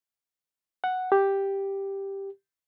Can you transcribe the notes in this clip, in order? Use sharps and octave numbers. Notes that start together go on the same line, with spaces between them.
F#5
G4